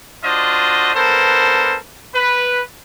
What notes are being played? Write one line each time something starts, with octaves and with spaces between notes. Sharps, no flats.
D4 F4 F#4 C5 D#5
B3 D4 A4 A#4 C5
B4